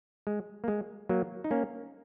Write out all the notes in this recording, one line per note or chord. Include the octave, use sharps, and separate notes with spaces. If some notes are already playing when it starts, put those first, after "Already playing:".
G#3
A#3
G#3
F#3 A#3
D#4
A#3 C#4